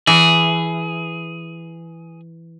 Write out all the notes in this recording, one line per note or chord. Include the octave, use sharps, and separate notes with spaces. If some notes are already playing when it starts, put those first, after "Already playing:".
E3 G#4